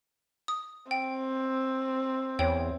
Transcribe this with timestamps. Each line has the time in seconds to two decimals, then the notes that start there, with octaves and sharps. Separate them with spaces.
0.48 D#6
0.91 C4 G5
2.39 E2 C#5 G5